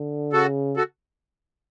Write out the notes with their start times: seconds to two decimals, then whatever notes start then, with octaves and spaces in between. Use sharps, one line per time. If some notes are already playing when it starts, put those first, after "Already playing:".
Already playing: D3
0.33 C#3 F#4 A4
0.77 F#4 A4